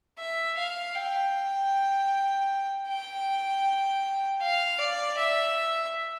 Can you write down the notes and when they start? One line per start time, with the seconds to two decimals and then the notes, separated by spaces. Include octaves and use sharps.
0.19 E5
0.58 F5
0.95 G5
2.88 G5
4.41 F5
4.79 D5
5.18 E5